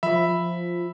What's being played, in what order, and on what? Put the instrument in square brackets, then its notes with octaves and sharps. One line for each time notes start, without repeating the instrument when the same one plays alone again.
[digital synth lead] F3 [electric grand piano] E5 B5